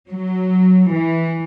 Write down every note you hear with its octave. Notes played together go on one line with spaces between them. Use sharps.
F#3
E3